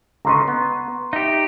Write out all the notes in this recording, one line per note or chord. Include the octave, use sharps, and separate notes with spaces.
C#2 D3 D#5 A#5 C6 C#6
B3
D#4 G4 E5